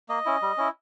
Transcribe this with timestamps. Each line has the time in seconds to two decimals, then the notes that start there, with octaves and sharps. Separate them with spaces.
0.09 A#3 D#5
0.26 C#4 E4
0.42 G3
0.58 C#4 E4